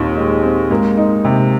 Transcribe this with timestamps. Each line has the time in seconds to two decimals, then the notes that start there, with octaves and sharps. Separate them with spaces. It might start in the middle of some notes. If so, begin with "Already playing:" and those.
Already playing: D#2 A#2 D#3 C4
0.16 G#3
0.43 C4
0.70 G#2 A#3
0.97 D#4
1.25 C3